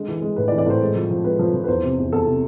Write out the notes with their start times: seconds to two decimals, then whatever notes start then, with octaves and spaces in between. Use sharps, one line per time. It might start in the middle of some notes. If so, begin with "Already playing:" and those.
Already playing: D3 G#3
0.08 E3
0.22 G#3
0.36 A2 B4
0.48 D5
0.52 E3
0.58 D5
0.66 A2 C5
0.81 G#3
0.96 F3
1.11 F3
1.24 G#3 B4
1.39 F3
1.54 F3
1.64 B4
1.68 E2 C5
1.83 C3
1.98 E2
2.12 E2 A4
2.27 C3